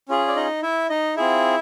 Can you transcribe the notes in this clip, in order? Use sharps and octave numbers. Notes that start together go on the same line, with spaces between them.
C#4 F4 G#4
D5
D#4 D#5
E4 E5
D#4 D#5
C4 E4 F4 G#4 E5